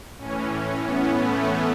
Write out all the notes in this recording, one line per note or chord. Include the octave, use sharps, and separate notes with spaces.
A2 E3 C#4
B3
A3